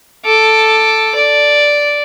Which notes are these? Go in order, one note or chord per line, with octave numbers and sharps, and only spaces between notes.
A4 D6
D5